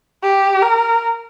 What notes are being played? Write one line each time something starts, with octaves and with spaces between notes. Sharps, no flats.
G4
A#4